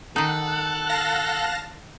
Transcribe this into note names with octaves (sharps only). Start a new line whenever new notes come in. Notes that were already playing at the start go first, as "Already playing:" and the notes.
D#3 D#4 A4 F#5 F#6
F5 A5 A#6